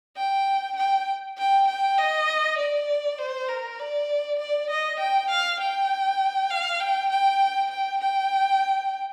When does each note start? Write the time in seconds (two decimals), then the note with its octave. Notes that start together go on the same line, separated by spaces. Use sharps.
0.16 G5
0.77 G5
1.38 G5
1.68 G5
1.98 D#5
2.58 D5
3.18 C5
3.48 A#4
3.79 D5
4.39 D5
4.70 D#5
5.00 G5
5.30 F5
5.60 G5
6.51 F5
6.80 G5
7.10 G5
7.71 G5
8.01 G5